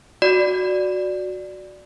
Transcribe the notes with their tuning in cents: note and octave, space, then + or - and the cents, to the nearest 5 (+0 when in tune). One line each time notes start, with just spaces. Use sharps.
F#4 -10 D5 +0